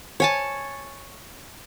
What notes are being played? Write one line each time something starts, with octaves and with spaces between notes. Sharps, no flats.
C#5 G#5 A5